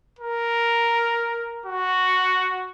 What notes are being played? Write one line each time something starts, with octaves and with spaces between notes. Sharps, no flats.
A#4
F#4